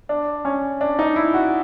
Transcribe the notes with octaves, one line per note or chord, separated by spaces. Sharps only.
D4
C#4
D4
D#4
E4
F#4